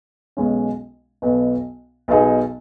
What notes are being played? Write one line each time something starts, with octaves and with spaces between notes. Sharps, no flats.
B1 B2 G#3 C#4
B1 B2 B3
B1 B2 B3 D#4 G#4